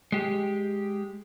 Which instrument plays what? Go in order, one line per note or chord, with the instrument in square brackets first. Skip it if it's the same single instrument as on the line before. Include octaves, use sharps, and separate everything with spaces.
[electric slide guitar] G#3 G4